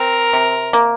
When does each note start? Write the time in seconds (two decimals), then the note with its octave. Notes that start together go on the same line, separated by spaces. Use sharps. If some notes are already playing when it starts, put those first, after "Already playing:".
Already playing: C4 A#4
0.33 C3
0.73 A#3